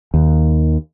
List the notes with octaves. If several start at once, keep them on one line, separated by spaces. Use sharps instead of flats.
D#2